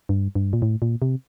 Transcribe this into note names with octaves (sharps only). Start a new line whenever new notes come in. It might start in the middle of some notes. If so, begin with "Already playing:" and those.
G2
G2
A#2
A2
A#2
C3